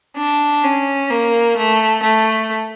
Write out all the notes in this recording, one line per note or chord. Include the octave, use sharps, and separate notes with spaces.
D4
C#4
A#3
A3
A3